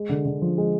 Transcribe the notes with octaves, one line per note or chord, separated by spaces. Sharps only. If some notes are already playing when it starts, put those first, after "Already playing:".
Already playing: G#3
D3
D3
F3
G#3